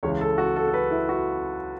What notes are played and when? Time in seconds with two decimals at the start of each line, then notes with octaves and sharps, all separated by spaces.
0.03 C#2 C#3 E3 C#5
0.21 A4
0.38 F#4
0.56 A4
0.68 A4
0.74 B4
0.91 E4
1.09 F#4